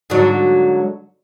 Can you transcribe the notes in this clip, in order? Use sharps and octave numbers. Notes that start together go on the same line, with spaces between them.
G#2 D3 F#3